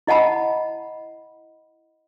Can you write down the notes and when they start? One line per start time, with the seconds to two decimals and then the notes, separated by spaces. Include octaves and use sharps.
0.07 E4 D#5 F#5 A5 B5